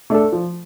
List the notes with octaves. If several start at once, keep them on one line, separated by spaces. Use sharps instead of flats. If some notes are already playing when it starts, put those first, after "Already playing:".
A3 D4 A4
F3